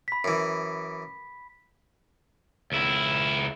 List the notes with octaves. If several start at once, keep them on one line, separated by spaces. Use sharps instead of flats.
B5 B6
F#2 E3
C#2 E4